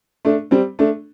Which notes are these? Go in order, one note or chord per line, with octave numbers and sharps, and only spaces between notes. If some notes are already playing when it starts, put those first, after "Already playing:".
A3 D4
G3 C4
A3 D4